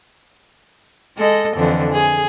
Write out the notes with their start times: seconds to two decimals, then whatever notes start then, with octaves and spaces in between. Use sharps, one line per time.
1.17 G#3 A4 D#5
1.56 F2 D3 E3
1.93 G#4